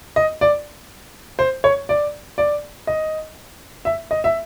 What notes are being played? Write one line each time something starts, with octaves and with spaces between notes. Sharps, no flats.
D#5
D5
C5
C#5
D5
D5
D#5
E5
D#5
E5